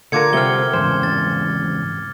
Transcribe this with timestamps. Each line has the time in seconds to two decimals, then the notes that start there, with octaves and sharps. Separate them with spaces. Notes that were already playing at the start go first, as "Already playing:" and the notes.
0.12 D3 F4 A#4 D6 G#6 C#7
0.33 C3 G3 C4 C5 F#5 F6 G7
0.73 E2 G#2 C#3 C5
1.03 A6